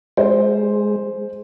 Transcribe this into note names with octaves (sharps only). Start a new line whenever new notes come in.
G#3 C5